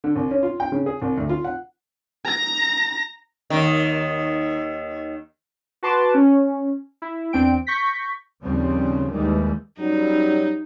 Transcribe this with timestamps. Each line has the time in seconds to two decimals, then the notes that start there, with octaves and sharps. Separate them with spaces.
0.04 D3
0.16 C2
0.31 C#4
0.43 F4
0.60 G5
0.72 C#3
0.86 G#4
1.02 C2
1.18 D2
1.29 F4
1.45 F#5
2.25 A#5 A#6
3.50 D#2 D#3
5.83 F#4 B4 A5 C6 D6
6.14 C#4
7.02 E4
7.33 E2 C4 D4 G5 D7
7.67 C#6 G6 A#6 B6
8.43 D#2 C#3 F3 G3 C4
9.11 D#2 D#3 E3 G3 G#3
9.79 F#2 F#3 G3 D#4